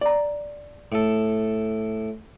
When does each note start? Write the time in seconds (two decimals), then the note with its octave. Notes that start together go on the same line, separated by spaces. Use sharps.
0.01 D5 A#5
0.92 A2 A4